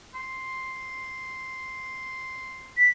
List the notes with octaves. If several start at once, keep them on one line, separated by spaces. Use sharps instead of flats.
C6
B6